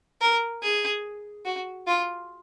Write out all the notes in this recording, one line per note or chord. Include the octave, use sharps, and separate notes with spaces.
A#4
G#4
F#4
F4